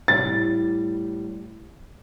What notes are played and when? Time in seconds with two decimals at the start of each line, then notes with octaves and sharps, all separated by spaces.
0.08 A2 G3 A6